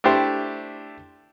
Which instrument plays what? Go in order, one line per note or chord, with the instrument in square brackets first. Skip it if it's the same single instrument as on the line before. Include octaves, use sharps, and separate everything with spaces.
[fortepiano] A3 D4 E4 G4 C5